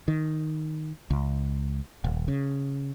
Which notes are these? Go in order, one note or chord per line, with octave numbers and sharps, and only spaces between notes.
D#3
C#2
D#1
C#3